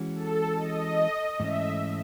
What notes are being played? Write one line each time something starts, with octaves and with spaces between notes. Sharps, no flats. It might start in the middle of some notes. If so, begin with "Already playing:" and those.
Already playing: E3 G#3 C#4 F#4
A4
D#5
G#2 E3 A3 C#4 E5